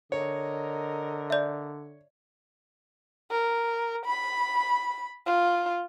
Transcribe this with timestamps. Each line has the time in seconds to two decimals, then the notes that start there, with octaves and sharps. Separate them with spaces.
0.12 D3 A#4 C#5 D#5
1.30 D5 E5
3.31 A#4
4.06 B5
5.26 F4